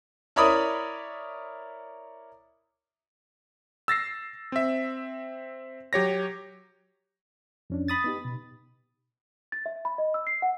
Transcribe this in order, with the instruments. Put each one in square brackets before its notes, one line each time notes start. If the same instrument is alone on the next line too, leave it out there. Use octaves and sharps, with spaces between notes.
[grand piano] E4 A#4 C#5 D5 B5 D#6
[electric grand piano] E6 A6 A#6 C7
C4 E5
F#3 G4 C#5 A#6
[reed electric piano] F2 C#4 D4
[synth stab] B5 D#6 A6
[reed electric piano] B3 D#4 G4
B2
[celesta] A6
E5
B5
D#5
E6
C7
F#5